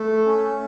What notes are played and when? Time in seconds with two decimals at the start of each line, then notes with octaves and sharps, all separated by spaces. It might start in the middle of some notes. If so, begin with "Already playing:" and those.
Already playing: A3
0.26 C#4